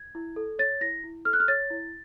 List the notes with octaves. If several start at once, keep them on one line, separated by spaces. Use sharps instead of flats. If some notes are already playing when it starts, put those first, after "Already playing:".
Already playing: G#6
E4
A4
C#5 A6
E4 A#6
E4
A4 F6
F#6
F6
C#5 A6
E4